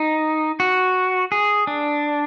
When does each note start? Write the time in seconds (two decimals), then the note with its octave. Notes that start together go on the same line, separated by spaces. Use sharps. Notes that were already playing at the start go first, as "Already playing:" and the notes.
Already playing: D#4
0.60 F#4
1.32 G#4
1.67 D4